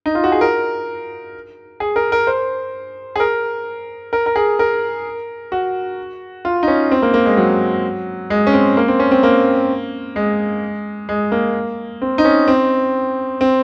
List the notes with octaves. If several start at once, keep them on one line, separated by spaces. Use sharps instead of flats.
D#4
F4
F#4
G#4
A#4
G#4
A#4
A#4
C5
G#4
A#4
A#4
A#4
G#4
A#4
F#4
F4
D#4
C#4
C4
A#3
A#3
G#3
F#3
G#3
C#4
C4
A#3
C4
C#4
C4
A#3
G#3
G#3
A#3
C4
D#4
C#4
C4
C4